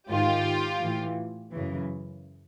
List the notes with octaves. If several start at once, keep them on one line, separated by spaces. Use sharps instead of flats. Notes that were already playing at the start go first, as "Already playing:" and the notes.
G#2 D#3 F4 G4
A2 E3
F#2 C#3 E3